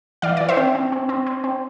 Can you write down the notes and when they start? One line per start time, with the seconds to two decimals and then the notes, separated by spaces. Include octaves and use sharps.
0.22 E3 D5 F5
0.37 E3 D5
0.49 C5 E5
0.57 C4
0.75 C4
0.92 C4
1.09 C4
1.27 C4
1.44 C4